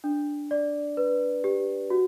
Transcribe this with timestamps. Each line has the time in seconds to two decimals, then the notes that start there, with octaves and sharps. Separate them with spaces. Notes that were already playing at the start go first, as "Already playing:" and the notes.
0.04 D4
0.51 D5
0.97 B4
1.44 G4
1.90 F#4